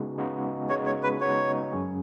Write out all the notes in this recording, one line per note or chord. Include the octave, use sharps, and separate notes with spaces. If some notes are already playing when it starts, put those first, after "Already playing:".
Already playing: C#3 G#3 B3 D#4 F#4
C#3 G#3 B3 D#4 F#4
C#3 G#3 B3 D#4 F#4 C#5
C#5
B4
C#3 G#3 B3 D#4 F#4 C#5
F#2 F#3 C#4 G#4